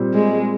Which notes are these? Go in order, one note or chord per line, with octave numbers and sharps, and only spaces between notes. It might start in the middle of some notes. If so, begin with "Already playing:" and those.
Already playing: A#2 G3 C4
G#3